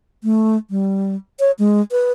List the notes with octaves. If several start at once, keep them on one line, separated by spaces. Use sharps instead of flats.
A3
G3
C#5
G#3
B4